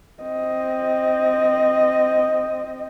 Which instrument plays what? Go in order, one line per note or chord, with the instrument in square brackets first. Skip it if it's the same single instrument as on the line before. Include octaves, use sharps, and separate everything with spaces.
[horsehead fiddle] C4 D#5